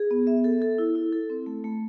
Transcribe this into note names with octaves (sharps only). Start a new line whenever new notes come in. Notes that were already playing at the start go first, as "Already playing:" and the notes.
Already playing: G#4
B3
E5
A4
A4
E4
E4
A4
C4
A3
A3